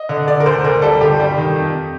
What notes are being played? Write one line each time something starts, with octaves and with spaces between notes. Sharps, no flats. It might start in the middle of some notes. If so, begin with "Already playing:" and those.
Already playing: D#5
D3
D3 D5
A#4
D2 C5
D2 A#4
G3 A4
G1 G4
G3
D#3
F2